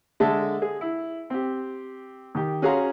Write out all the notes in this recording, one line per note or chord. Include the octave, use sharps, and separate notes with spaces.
D3 G#3 E5 A5
G#4
E4
C4 G4
D#3 G4
C#4 F#4 G#4 F5 A#5 C6